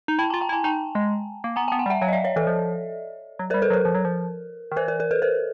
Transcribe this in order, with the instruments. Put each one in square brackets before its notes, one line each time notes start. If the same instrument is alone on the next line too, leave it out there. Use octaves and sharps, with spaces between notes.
[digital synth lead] D#4
[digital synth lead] E4 [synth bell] G5 A5
[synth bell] G#5 A#5
[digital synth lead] F4
[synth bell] G5 A5
[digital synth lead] E4
[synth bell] G#5 A#5
[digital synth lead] D#4 [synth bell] G5 A5
[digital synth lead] G#3
A#3
[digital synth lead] B3 [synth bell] G#5 A#5
[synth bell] G5 A5
[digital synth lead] B3
[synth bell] F#5 G#5
[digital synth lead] G3
[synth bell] E5 F#5
[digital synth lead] F#3 [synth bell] F5 G5
[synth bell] D#5
D5 E5
C#5 D#5
[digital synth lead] E3 [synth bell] A4
[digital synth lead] F3
F#3
[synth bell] A#4 C5
[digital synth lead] G3
[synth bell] A4 B4
[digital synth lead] F#3
[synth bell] A#4
[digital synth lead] F3
F#3
F3
D#3
[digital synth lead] E3 [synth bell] A#4 C5
[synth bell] A#4
A#4
A4 B4
A#4 C5